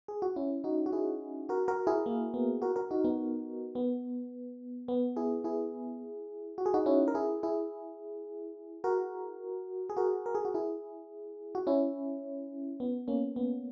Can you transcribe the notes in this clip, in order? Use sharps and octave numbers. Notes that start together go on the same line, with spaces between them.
G#4
F#4
C#4 E4
D#4 F#4
F#4
E4 G#4
F#4 A#4
F#4 A#4
E4 G#4
A#3
B3
F#4 A#4
F#4 A#4
D#4 F#4
B3 D#4
B3
B3
E4 G#4
E4 G#4
F#4
G#4
D#4 F#4
C#4 E4
A#4
E4 G#4
E4 G#4
F#4 A#4
G#4
F#4 A#4
A#4
G#4
F#4
E4 G#4
F#4
C#4 E4
B3
A#3 C#4
B3